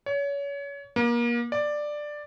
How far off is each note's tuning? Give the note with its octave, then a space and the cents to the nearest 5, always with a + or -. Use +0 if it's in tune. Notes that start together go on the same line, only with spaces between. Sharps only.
C#5 +30
A#3 +30
D5 +10